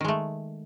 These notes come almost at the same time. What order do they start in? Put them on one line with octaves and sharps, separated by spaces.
D#3 G#3 A3